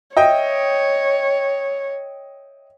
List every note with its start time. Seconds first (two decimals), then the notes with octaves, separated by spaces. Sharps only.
0.17 C#5 D#5 E5 G5